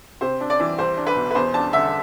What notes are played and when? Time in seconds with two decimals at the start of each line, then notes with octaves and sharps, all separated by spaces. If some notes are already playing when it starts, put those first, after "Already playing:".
0.21 C3 C5
0.40 D4
0.50 D5
0.60 E3
0.78 C2 C5
0.97 D4
1.07 B4
1.16 B2
1.31 B4
1.35 E2 C5
1.54 D4 A5
1.73 D3 E5